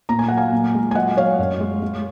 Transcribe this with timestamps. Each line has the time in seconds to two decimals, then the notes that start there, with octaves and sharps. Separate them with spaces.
0.09 A#2 A#5
0.19 G#5
0.28 F#3 F#5
0.37 F5 G#5
0.52 A#2
0.74 G#3
0.91 G#5
0.95 F#3 D#5 F#5
1.17 F#3 C#5 F5
1.39 F#2
1.60 G#3
1.82 G#3